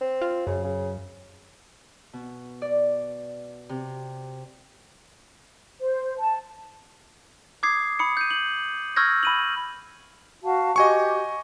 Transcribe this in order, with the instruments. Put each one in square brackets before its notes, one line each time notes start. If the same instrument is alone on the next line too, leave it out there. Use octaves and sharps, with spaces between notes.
[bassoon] C4
[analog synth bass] F4
[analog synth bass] F#2 [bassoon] C#3
[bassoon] C#3
[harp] B2
D5
C3
[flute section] C5
A5
[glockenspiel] D6 D#6 G#6 C7
B5 D#6 C#7
G6 D#7
F#7
C#6 E6 F6 G6 G#6 A#6
B5 D#7 F#7
[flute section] F#4 F5 A5
[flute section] F#4 G4 [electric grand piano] D#5 G#5 C#6